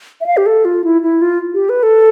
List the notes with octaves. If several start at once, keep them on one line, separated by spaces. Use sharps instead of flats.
E5
F5
G4
A4
F4
E4
E4
F4
G4
B4
A4